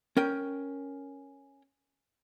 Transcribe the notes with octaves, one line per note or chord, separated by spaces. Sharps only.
C#4 A#4 G5